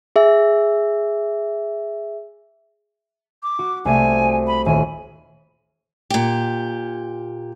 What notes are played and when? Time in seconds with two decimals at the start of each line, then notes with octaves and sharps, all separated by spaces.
0.16 G#4 E5
3.43 D6
3.59 F#4
3.85 C2 A3 G#5 D#7
4.47 B5
4.66 D#1 G#5
6.10 A#2 G4